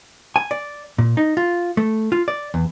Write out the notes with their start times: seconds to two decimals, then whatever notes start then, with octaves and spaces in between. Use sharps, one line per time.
0.36 G#5
0.51 D5
0.98 A#2
1.17 D#4
1.37 F4
1.77 A3
2.12 F4
2.28 D5
2.54 E2